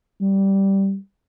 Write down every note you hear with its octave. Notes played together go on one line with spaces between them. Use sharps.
G3